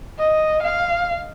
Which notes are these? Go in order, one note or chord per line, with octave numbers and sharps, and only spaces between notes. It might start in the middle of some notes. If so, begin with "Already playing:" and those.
D#5
F5